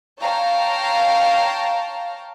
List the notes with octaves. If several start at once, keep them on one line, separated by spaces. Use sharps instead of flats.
C#5 F5 G5 A5 A#5